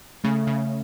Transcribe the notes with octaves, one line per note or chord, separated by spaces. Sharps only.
C#3 A3
C#3